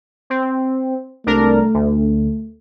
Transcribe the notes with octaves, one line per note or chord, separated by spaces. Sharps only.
C4
C2 A3 D4 A#4
D2